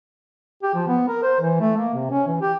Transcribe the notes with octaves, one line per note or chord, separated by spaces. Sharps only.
G4
F3
B3
A#4
C5
E3
A3
A#3
C3
C#4
E3
G4